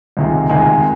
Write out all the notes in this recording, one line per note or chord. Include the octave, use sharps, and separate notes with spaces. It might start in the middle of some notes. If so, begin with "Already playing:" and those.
C#2 C3 D#3 G#3
C#2 C3 D#3 G#3